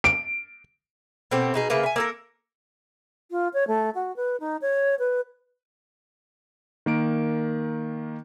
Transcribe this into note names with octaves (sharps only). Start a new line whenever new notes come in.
D7
B2 A3 C4 G4
B2 D#4 G#4
C#3 A3 A#3 B4
E5 G#5
A#3 A4 A#4
F4
C#5
A3
F#4
B4
D#4
C#5
B4
D#3 A#3 D7